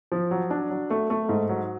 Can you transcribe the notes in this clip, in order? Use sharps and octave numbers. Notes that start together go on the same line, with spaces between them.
F3
F#3
D4
F#3
A3
A3
G#2
F#3